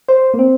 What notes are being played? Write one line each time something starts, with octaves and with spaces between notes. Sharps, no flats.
C5
A#3
C4